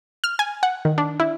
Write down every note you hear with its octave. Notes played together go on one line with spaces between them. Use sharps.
F6
G#5
F#5
D#3
D4
E4